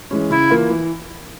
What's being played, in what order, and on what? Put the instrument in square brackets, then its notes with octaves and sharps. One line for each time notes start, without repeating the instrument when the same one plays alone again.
[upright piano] E3 G#3 C#4
[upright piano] C#3 [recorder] E4
[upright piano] E3 A#3 F4
E3